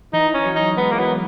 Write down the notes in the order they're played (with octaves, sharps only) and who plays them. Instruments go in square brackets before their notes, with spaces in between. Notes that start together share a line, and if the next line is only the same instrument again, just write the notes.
[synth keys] E3 [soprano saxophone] D#4
[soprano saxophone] C#4
[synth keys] F#3
[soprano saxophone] D#4
[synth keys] G#3 [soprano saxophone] B3
[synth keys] E3 [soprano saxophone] A#3
[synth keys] F#3 [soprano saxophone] B3